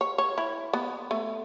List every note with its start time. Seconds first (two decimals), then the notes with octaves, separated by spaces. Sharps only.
0.01 C#5
0.18 C#5
0.38 E4
0.73 B3
1.11 A3